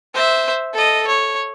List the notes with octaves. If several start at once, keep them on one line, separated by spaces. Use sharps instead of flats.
C5 E5
A4 D#5
C#5